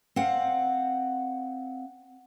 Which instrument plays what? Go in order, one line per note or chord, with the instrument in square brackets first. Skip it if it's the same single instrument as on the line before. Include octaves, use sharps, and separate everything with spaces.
[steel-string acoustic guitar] C4 F5 F#5